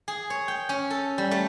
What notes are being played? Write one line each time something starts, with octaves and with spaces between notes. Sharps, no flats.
G#4
C#5
G5
C#4
A4
G3
A3